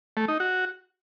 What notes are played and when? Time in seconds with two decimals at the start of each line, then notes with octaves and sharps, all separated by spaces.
0.17 A3
0.28 D#4
0.40 F#4